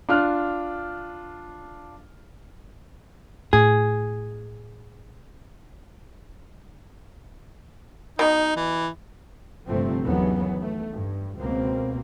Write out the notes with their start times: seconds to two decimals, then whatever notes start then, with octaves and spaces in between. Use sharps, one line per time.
0.09 D4 F4 F6 F#6
3.53 A2 G#4
8.19 B2 D#4
8.57 E3
9.67 G1 C3 F3 A3 C4
10.05 D#2 C#3 E3 F#3 B3
10.60 A3
10.92 G2
11.38 C#2 B2 A#3 C4